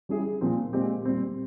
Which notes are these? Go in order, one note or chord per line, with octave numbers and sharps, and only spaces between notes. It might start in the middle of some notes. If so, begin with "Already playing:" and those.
G3 C#4 E4 G#4
A#2 F3 C4
A#2 G#3 C4 G4
A#2 G3 C4